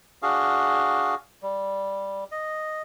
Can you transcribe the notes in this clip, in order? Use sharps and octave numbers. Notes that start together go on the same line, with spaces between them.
D4 F#4 G#4 F5
G3
D#5